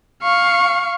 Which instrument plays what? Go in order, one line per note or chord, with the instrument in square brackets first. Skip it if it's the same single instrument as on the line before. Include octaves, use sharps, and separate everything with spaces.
[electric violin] F5 C#6